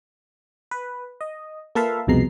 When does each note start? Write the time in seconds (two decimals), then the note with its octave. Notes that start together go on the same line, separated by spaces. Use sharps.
0.71 B4
1.21 D#5
1.75 A#3 F4 A4 B4 E5 F5
2.07 C2 F2 B2 G#3 A#5 C7